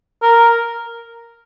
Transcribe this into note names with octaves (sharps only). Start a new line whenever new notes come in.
A#4